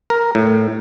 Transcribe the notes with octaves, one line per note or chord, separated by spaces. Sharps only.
A#4
A2